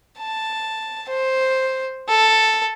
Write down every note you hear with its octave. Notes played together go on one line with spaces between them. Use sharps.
A5
C5
A4